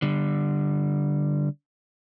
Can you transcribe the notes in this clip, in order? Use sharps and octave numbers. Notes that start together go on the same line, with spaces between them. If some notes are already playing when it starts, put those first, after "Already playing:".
D3 G3